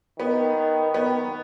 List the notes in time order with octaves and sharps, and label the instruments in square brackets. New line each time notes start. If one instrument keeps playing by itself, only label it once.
[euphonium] D#3 [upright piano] B3
[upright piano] B3